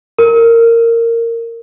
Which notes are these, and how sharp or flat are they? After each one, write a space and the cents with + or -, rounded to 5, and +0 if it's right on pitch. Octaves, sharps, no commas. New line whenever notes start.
A#4 -15